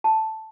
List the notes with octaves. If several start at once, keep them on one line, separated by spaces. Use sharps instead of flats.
A5